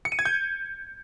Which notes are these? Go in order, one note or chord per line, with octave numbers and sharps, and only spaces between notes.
C#7
D#7
G#6
G6